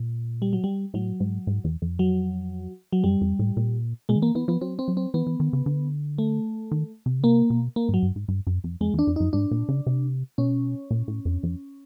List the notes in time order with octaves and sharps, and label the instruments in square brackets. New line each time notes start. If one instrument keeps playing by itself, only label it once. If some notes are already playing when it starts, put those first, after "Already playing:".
Already playing: [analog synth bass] A#2
[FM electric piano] G3
F#3
G3
[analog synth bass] A2 [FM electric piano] F#3
[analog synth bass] G#2
G#2
E2
F2
[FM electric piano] F#3
F#3
[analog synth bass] F#2 [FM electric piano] G3
[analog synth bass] F2
A2
A#2
[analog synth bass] B2 [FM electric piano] G#3
[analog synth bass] D#3
[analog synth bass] E3 [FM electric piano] A#3
[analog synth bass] E3 [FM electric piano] B3
[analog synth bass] F3 [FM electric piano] B3
[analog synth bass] F#3 [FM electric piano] C4
[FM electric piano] C4
[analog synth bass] F#3
[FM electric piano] C4
[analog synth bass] E3 [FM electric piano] B3
[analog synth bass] E3
D#3
C#3
D3
[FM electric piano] A3
[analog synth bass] D#3
C3
C#3
[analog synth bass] C3 [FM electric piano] A#3
[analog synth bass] B2
[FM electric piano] A#3
[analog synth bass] G#2
[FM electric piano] F#3
[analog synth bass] G2
G#2
G2
F#2
F2
[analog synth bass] F2 [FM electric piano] G#3
[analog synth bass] E2
[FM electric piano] D4
[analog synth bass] F2
[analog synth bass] F#2 [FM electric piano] D#4
[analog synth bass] G#2 [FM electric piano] D4
[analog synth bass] A#2
C#3
C3
[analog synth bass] B2 [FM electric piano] C#4
[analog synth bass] A#2
A2
F2
F2